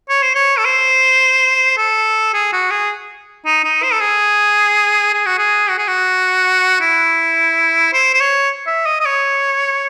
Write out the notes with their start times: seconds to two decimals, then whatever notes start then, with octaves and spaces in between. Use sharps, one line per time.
0.10 C#5
0.23 C5
0.35 C#5
0.58 A4
0.65 C5
1.77 A4
2.34 G#4
2.53 F#4
2.71 G#4
3.46 D#4
3.64 D#4
3.83 C5
3.93 A4
4.01 G#4
5.14 G#4
5.26 F#4
5.38 G#4
5.69 F#4
5.78 G#4
5.88 F#4
6.81 E4
7.93 C5
8.14 C5
8.20 C#5
8.67 E5
8.86 D#5
9.00 D#5
9.05 C#5